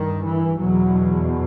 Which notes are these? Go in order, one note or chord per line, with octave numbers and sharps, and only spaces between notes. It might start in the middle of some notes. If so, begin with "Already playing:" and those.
Already playing: G2 D#3
E3
E2 B2 F#3